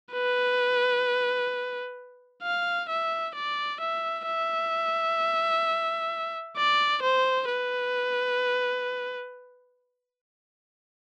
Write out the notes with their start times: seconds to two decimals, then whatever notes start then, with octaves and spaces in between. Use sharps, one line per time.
0.13 B4
2.43 F5
2.89 E5
3.35 D5
3.81 E5
4.27 E5
6.57 D5
7.03 C5
7.49 B4